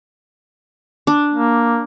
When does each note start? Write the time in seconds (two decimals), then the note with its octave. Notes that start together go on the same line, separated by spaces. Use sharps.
1.07 D4
1.34 A#3